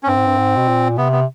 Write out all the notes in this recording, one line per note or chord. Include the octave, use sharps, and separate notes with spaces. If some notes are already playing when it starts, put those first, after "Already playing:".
C#4
G2 C4
G#2
G2
G#2
B2
A#2
C3 B3
B3